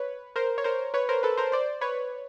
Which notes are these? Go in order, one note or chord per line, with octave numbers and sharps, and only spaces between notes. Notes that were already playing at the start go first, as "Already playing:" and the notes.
Already playing: B4 C#5
A#4 C5
C#5
A#4 C5
B4 C#5
A#4 C5
A4 B4
A#4 C5
C5 D5
B4 C#5